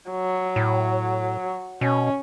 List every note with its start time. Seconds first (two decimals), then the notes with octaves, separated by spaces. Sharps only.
0.11 F#3
0.56 A2
1.81 B2 C#4